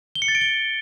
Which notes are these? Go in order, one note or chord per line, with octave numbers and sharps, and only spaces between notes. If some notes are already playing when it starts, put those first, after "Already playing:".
G7
C#7
A6
D7
G7